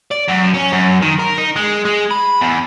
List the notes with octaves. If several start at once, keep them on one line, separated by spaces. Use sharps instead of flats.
D5
F#2
C#4
F#2
D#3
A#4
D#4
G#3
G#3
B5
E2